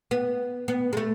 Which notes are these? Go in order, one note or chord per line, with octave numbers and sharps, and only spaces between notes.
B3
B3
G#3
A3